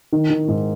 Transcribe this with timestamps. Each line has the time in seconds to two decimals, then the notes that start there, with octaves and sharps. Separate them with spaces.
0.13 D#3
0.30 D#3
0.48 G#2